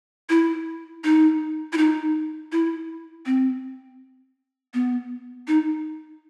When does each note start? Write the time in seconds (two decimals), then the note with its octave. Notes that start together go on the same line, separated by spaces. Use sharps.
0.30 E4
1.04 D#4
1.73 E4
1.78 D#4
2.52 E4
3.26 C4
4.74 B3
5.48 D#4